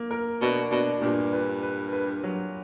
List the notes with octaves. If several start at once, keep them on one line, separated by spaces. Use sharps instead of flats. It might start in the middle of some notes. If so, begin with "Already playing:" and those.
Already playing: A#3
A#4
B2 D4
B2 D4
G2 A#2
B4
B4
B4
F#3